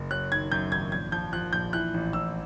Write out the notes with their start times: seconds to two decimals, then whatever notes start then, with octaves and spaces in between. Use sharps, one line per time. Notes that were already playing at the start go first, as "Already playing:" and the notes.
Already playing: F#1
0.11 F#3 F#6
0.31 D#3 G#6
0.51 F#2 G6
0.71 G#1 G#6
0.92 A#1 G#6
1.12 F3 G6
1.33 F3 F#6
1.53 A#1 G6
1.73 E3 F#6
1.94 A1
2.13 A1 E6